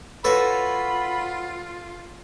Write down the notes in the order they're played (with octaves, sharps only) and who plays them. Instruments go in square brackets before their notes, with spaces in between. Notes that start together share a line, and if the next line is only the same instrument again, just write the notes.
[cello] F4 [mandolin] F#4 C#5 [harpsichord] A4 B4 [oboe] B5